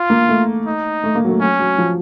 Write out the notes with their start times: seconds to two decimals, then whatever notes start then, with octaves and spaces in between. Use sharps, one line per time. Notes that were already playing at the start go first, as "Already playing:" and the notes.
Already playing: F4
0.10 A#3
0.29 A3
0.67 D#4
1.04 A3
1.15 A#3
1.25 F#3
1.29 A3
1.40 F#3 C#4
1.60 F#3
1.78 F3